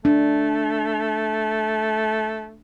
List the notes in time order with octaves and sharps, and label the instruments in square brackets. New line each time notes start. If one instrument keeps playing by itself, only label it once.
[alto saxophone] A3 [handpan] D4